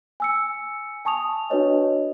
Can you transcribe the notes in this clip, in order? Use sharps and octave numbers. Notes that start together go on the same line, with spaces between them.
G#5 E6 C#7
G#5 A5 C#6 D#6 F7
D4 F#4 B4 C#5 D#5